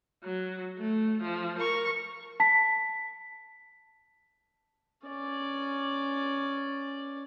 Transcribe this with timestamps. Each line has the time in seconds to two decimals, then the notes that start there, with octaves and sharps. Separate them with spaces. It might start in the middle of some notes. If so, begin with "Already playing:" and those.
0.24 F#3
0.78 A3
1.22 F3
1.58 A#4 C#6
2.40 A5 B6
5.07 C#4 D5